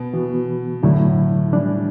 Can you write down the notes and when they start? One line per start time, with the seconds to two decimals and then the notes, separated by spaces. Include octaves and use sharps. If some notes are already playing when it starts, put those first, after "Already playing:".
Already playing: B2
0.13 E3 B3 F#4
0.83 A2 D3 F#3 A3 E4
1.53 E3 G3 D4